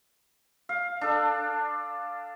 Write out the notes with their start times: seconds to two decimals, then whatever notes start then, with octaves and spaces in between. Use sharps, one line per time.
0.69 F5
1.01 D4 A4